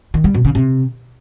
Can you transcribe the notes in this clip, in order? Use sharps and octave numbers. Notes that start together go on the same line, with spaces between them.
D#3
G3
B2
C#3
C3